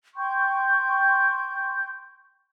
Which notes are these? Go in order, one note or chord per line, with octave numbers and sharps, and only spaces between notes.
G5 C6 C#6 G6